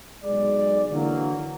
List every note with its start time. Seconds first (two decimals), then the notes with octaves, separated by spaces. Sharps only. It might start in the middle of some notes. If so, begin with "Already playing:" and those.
0.25 B1 G#3 D5
0.90 D3 E3 F#3 A#3